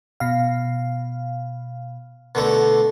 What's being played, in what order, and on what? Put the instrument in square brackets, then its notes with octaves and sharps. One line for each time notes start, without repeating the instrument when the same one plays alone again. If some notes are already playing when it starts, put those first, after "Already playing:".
[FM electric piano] B2 F5
[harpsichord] B2 D3 A3